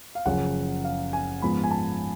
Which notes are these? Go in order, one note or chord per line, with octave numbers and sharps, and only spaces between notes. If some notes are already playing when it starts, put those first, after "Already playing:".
F5
F#1 F#2 C#3 F3 F#5
F5
G#5
G#2 F3 B3 B5
G#5
A5